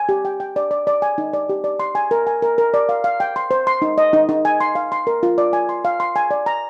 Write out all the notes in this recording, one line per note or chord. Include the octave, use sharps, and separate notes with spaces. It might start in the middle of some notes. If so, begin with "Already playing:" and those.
Already playing: G#5
G4
G5
G5
D5
D5
D5
G#5
D#4
D5
G4
D5
C6
G#5
A#4
G#5
A#4
A#4
D5
F5
F5
G5
C6
C5
C6
D#4
D#5
D#4
D#4
G#5
C6
F5
C6
A#4
F4
D5
G#5
C6
F5
C6
G#5
D5
A#5